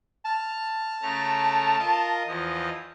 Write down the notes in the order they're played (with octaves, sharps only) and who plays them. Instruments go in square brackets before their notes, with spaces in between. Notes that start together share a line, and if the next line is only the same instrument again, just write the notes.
[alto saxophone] A5 [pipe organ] F6
[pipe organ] C#3 A3 A#5
F4 A#4 D#5
E2 F3 D#5